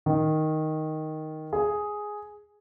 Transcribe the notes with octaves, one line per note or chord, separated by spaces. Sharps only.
D#3
G#4